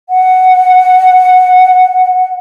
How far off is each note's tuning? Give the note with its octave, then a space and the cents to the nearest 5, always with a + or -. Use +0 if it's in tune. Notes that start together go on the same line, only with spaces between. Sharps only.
F#5 +0